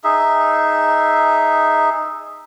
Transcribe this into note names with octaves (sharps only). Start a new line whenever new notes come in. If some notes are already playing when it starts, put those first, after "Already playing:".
D#4 G#4 E5